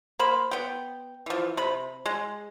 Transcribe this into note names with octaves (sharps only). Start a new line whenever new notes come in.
A#3 C5 B5
B3 G5
E3 F3
C3 B5
G#3